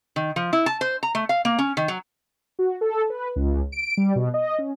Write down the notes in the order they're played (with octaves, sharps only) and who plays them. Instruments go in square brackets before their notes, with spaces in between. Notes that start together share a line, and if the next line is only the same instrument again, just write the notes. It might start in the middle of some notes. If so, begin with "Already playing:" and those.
[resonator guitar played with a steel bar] D#3
F3
E4
A5
C5
A#5
A3
F5
A#3
C#4
D#3
F#3
[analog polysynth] F#4
A4
B4
C#2
D7
G3
B2
D#5
C#4